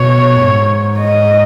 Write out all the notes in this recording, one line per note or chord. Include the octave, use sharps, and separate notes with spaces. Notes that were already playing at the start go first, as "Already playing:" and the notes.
Already playing: B2 C#5
G#2
D#5